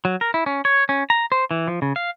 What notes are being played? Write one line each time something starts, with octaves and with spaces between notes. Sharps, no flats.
F#3
A#4
E4
C#4
C#5
C#4
A#5
C5
E3
F3
C#3
F5